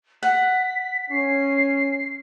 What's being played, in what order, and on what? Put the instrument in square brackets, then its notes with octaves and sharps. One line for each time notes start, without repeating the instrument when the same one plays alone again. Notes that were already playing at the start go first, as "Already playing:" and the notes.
[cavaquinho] F#5 [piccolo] B6
[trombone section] C#4 [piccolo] C7